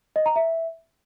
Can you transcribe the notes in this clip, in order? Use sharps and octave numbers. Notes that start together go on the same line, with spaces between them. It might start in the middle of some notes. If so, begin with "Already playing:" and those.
D#5
A#5
E5